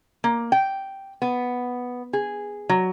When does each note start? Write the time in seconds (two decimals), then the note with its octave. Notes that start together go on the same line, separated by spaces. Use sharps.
0.24 A#3
0.52 G5
1.22 B3
2.13 G#4
2.69 F#3